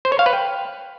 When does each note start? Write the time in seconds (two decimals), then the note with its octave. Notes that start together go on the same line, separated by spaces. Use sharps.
0.05 C5
0.12 C#5
0.19 F5
0.26 B4
0.33 G5